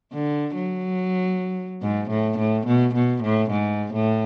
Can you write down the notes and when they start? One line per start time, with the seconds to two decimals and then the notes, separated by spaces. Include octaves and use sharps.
0.13 D3
0.55 F#3
1.82 G#2
2.10 A2
2.38 A2
2.66 B2
2.94 B2
3.23 A2
3.51 G#2
3.93 A2